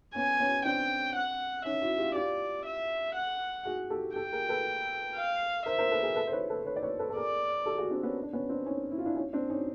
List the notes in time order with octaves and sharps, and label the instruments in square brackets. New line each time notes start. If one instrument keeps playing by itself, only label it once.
[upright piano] B3 C#4 [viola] G#5
[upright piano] B3 C#4
[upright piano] C4 D4 [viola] G5
[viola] F#5
[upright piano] C#4 D#4 [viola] E5
[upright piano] E4 F#4
F4 G4
[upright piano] F4 G4 [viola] D5
[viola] E5
F#5
[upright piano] F#4 G#4
G4 A4
[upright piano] G4 A4 [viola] G5
[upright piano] G#4 A#4
A4 B4
[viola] F5
[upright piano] A#4 C5 [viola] E5
[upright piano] A#4 C5
A4 B4
G#4 A#4
A4 B4
C5
B4 C#5
A4 B4
B4 C#5
D5
B4 C#5
A4 B4
A4
[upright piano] G#4 A#4 [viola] D5
[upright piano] G4 A4
F#4 G#4
C4 D4
B3 C#4
D4
B3 C#4
C4 D4
C#4 D#4
E4
F4
D4 E4
C#4 D#4
C4 D4
C#4 D#4